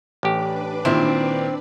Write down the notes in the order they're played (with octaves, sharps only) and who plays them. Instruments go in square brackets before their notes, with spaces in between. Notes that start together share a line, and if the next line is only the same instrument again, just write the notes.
[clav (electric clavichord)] A1 G4 [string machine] D4 B4 D5
[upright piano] A#2 D#3 E4 [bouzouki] C4